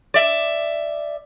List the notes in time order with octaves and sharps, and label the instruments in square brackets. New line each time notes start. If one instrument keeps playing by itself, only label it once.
[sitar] D5 E5